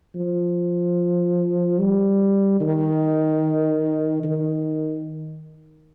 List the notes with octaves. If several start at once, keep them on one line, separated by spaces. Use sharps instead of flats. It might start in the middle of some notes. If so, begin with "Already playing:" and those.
F3
G3
D#3
D#3